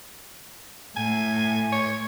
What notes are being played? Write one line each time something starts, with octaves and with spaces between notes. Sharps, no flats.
A2 G#5
C#5